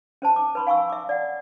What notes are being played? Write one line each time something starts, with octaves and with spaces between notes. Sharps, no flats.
C#4 C5 A5
D6
B4 B5 C6
F5 G#5 C#6 E6
E5 D6
D5 F#5